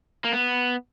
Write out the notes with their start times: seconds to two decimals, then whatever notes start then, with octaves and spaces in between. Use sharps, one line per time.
0.24 A#3
0.33 B3